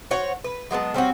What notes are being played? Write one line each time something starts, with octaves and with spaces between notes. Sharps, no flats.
F#4 C5 C#5 F#5
B4
F#3 G#3 B3 A5
G3 C4 C#4 F#4